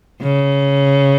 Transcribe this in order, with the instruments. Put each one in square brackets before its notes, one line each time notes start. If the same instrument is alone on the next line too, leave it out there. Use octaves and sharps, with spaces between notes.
[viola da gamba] C#3